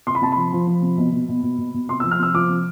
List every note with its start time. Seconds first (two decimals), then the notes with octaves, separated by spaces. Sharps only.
0.07 C3 C6
0.15 B5
0.22 C3 A5
0.32 F3 B5
0.53 F3
0.67 F3
0.82 C3
0.98 B2
1.12 B2
1.29 B2
1.43 B2
1.58 B2
1.74 B2
1.89 C3 C6
2.00 F3 E6
2.11 F6
2.19 C3 E6
2.34 F3 D6
2.49 C3